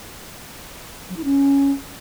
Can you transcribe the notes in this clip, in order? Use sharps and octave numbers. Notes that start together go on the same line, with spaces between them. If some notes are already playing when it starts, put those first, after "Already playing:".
F#3
E4
C#4